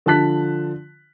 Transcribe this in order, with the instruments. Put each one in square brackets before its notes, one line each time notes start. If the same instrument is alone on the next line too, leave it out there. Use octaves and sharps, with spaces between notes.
[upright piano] D3 F3 A5 F#6 B6